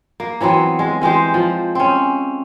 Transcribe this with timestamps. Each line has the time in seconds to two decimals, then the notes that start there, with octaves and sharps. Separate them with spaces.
0.20 A#3
0.41 E3 F#3 B3 C4
0.79 G#3
1.02 E3 G#3 G4 C5
1.34 F3
1.75 C4 C#4